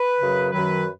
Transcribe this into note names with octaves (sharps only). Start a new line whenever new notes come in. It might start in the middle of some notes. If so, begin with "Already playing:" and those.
Already playing: B4
F#2 C#3 F#3
F#2 D#3 F#3 B4